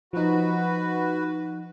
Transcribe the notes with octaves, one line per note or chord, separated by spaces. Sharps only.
F3 D#4 F#4 B4